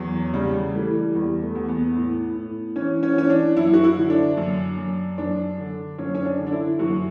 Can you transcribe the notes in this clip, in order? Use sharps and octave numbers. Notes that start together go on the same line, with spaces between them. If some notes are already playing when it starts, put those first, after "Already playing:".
Already playing: E2 F#3
C#3 G3
G3
E3 A3
G3
E2 G3
A3
E2
B3
A2
A2
E3 C#4
C#4
E3 C#4
D4
F#2 E4
F#4
E4
D3
D4
F#2
F#2
F#2 D4
D3
F#2 C#4
C#4
D4
D3
D4
E4
F#2 F#4